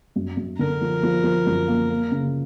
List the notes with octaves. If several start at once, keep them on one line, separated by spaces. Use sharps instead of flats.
F#2
F#2
D3 A#4
F3
F3
F3
F#2
A#3
A#3
C#3